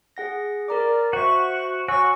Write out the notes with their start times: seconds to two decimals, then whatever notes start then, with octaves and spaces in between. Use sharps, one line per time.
0.17 G#4 F#5 A#6
0.68 A#4 D5 A#5 D6
1.13 F#4 C5 E5 C#6
1.88 F#4 C#5 G#5 C#6 E6